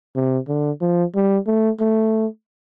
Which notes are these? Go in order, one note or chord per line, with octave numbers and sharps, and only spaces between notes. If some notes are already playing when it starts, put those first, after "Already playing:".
C3
D3
F3
G3
A3
A3